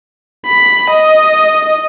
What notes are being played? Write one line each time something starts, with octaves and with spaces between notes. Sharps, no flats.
B5
D#5